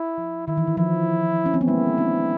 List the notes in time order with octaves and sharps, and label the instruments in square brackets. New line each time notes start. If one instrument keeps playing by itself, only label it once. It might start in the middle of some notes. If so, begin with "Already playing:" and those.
Already playing: [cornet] E4
[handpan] F3
[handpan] D#3 [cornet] E4
[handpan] E3
D#3
[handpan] F3 [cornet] E4
[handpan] C#4
C4
B3
[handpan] G#3 A#3 [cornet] E4
[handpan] C4 D4